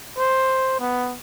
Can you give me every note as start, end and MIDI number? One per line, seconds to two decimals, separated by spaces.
0.18 0.76 72
0.80 1.16 59